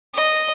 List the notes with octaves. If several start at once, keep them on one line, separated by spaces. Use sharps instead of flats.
D#5